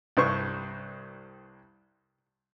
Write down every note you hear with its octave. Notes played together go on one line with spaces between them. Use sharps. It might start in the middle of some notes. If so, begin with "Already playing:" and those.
C2 G2 C5 C#6